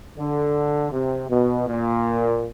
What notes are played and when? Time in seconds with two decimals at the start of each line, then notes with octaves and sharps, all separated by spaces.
0.18 D3
0.92 C3
1.30 B2
1.67 A#2